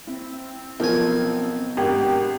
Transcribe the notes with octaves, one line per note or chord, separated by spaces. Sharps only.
C4 E4
B1 F3 A#4 G#5
G#1 D4 G4